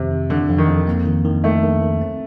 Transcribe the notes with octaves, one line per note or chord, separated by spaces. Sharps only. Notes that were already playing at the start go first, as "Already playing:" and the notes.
Already playing: F2 C3 D#3
D#3
D3 G3
F2
D#3
F2
A#3
D#3
D#3
D#3 A3
D#3
D#3
C4